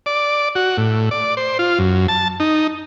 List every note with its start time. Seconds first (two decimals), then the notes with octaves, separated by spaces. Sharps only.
0.06 D5
0.55 F#4
0.77 A2
1.11 D5
1.37 C5
1.59 F4
1.79 F#2
2.08 A5
2.40 D#4